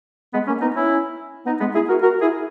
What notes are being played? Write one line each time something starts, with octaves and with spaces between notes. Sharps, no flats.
G#3 B3
A#3 C#4
B3 D#4
C#4 E4
B3 D#4
G#3 B3
E4 G#4
F#4 A#4
F#4 A#4
E4 G#4